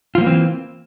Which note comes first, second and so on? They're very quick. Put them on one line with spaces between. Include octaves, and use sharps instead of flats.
F4 F3 A#3 E3 C4